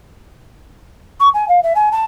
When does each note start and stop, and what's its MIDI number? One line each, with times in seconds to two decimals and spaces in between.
1.20 1.29 85
1.34 1.48 80
1.48 1.60 77
1.63 1.73 76
1.75 1.89 80
1.92 2.05 81